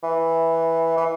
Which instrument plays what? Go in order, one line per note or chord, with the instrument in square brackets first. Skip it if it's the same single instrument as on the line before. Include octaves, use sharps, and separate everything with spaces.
[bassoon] E3
E3